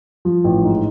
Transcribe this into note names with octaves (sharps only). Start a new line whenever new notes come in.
F3
A1
G#2